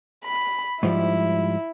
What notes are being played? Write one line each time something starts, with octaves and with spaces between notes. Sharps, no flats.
B5
G#2 F3 G3 E4